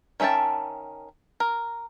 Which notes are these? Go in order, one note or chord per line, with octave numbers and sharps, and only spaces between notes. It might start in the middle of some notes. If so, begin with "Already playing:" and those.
D#3 C#4 E5 G5 A5
A#4